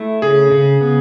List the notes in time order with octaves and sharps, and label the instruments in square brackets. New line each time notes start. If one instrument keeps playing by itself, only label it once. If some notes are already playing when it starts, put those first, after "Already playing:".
Already playing: [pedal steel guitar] A3 E4
[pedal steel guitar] C#3 [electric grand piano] G#4
[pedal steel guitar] C#3
B3